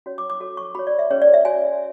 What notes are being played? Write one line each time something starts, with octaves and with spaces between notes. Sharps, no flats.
C#4 F#4 C#5
D6
D6
F#4 A4 C#5
C#6
F#4 C#5 B5
D5
E5
C#4 G#4 B4 C#5
D5
E5
F#4 C#5 G#5